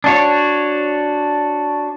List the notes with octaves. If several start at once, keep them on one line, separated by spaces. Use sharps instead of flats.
D4 F#4 C#5